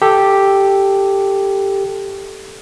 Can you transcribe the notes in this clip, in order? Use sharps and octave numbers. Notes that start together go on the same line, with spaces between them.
G4 A4